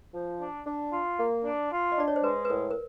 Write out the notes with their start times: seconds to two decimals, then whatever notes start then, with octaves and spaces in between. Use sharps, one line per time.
0.14 F3
0.40 D4
0.66 D4
0.92 F4
1.18 A#3
1.44 D4
1.71 F4
1.92 D#5
1.98 D4 D5
2.08 C#5
2.16 C5
2.23 G#3 B4
2.45 B4
2.49 A2 A#4
2.71 A#4